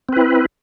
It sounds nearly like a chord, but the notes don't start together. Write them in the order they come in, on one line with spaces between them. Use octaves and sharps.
C4 B4 E4